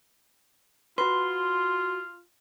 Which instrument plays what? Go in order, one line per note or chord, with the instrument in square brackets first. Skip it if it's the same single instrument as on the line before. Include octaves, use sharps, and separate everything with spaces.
[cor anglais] F4 [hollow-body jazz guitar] F#4 B4 [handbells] C6